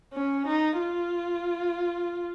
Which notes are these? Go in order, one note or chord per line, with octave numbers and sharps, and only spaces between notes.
C#4
D#4
F4